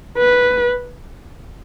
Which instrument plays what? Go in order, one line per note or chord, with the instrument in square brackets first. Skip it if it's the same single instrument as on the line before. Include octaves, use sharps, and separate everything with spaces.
[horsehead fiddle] B4